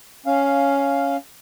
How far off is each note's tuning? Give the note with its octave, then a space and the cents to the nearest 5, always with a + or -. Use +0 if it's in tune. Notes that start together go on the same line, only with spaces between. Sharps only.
C#4 +5 F5 +0